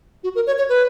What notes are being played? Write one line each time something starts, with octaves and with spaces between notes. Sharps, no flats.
F#4
A#4
C#5
C#5
B4